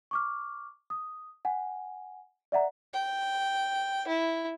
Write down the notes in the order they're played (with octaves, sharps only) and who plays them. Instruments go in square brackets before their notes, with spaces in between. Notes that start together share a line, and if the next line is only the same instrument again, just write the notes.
[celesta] C#6 D6 F6
D#6
F#5 G#5
D5 E5 F#5 A#5
[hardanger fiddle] G5
E4